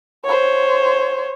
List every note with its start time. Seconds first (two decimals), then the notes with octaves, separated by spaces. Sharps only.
0.24 C5 C#5